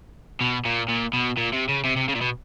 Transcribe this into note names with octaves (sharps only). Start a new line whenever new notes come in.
B2
A#2
A#2
B2
A#2
C3
C#3
C3
C3
C#3
A#2
B2